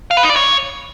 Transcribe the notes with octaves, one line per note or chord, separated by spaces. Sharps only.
F5
B4
D#4
D5
C#5